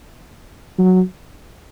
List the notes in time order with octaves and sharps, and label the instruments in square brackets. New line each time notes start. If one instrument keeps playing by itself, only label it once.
[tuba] F#3